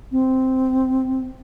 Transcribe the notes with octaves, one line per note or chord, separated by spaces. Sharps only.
C4